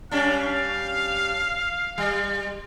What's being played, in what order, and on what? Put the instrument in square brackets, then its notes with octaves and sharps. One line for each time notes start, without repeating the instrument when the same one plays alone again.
[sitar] G3 C#4 D4 [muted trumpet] F5
[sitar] G3